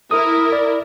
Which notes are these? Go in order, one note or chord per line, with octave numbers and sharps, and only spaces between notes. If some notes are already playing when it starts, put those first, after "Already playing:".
E4 A#4 D#6
D5